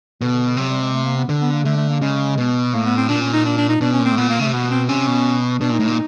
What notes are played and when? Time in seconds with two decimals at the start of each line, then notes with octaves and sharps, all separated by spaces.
0.21 B2 D3
0.33 D3
0.46 D3
0.57 C3 F#3
0.69 G3
0.81 G#3
0.93 A3
1.05 A#3
1.17 B3
1.29 D3
1.42 B3
1.53 A#3
1.65 D3 A3
1.77 A3
1.89 A#3
2.01 C#3 G#3
2.38 B2
2.73 A2 A#3
2.85 B3
2.97 C4
3.08 A#2 D4
3.21 C#4
3.33 D#4
3.45 D4
3.57 D4
3.69 D#4
3.81 B2 D4
3.93 C#4
4.00 A#2
4.05 C4
4.12 A2
4.17 A#2 B3
4.30 A#3
4.39 C#3 A3
4.46 C3
4.53 B2 B3
4.71 C4
4.89 C3 C#4
5.07 B2
5.61 B2 D4
5.70 A#2
5.73 D#4
5.79 A2
5.85 A#2 D#4